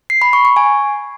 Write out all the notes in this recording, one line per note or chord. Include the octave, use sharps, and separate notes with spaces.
C7
B5
C#6
C#6
G#5